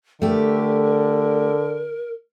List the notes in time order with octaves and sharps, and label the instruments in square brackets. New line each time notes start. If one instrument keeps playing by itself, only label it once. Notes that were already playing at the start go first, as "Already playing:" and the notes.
[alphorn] D3 [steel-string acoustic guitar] A3 G4 [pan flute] A#4